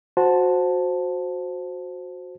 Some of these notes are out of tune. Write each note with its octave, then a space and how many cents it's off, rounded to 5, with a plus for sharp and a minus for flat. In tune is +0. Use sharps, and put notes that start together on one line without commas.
F#4 -20 C5 +0 A5 +0